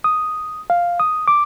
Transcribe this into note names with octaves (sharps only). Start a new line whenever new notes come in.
D#6
F5
D#6
D6